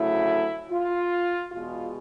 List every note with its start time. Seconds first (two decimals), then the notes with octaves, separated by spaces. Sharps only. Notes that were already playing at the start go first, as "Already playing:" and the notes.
Already playing: D2 C#3 F#3 A3 E4
0.70 F4
1.52 E2 B2 G#3 F4